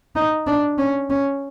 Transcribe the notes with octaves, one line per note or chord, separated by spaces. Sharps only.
D#4
D4
C#4
C#4